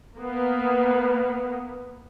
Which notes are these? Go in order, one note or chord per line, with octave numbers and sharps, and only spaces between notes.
A#3 B3